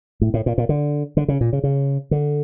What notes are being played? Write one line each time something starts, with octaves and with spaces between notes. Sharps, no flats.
A2
A2
A#2
A#2
D3
D3
C#3
A#2
C#3
C#3
D3